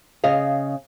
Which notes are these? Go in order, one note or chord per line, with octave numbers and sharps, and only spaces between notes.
C#3 D#5 F5